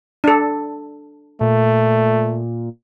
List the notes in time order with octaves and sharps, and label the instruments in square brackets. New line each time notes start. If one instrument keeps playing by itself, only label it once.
[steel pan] D4 A4
[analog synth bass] A#2 [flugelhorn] A3